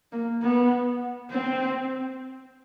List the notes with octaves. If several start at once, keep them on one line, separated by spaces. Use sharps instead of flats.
A#3
B3
C4